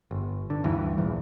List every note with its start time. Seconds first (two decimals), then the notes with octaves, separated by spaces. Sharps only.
0.11 G1
0.50 D3
0.64 D2 G2 E3
0.98 A#1 E2